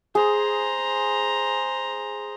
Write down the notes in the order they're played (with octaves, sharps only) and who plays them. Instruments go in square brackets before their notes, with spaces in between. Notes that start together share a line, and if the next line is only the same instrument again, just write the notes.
[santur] G#4 [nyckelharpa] C5 A#5